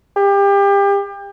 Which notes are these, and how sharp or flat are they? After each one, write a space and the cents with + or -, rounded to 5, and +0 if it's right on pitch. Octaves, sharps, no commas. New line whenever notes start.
G4 +30